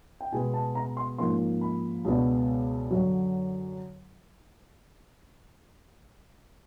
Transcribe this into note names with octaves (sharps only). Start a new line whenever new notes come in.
G5
B2 G#3 B3 G#5
A5
A#5
C6
G#2 F3 A#3 C#4 C6
B5
C#2 B2 G#3 B3 D4
F#2 D3 F#3